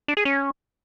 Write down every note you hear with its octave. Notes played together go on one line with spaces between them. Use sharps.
D4
G#4
C#4